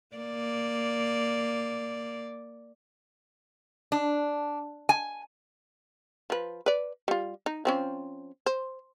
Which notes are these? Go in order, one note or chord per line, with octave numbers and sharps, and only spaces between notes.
A#3 D5
D4
G#5
F3 B4
B4 D5
G3 F4
D#4
F3 C4 C#4
C5